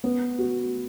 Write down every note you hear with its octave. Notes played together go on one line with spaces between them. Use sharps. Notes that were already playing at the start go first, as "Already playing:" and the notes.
B3
F#4